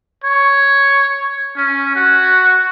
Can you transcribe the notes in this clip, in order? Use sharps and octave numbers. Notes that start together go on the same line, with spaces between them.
C#5
C#4
F#4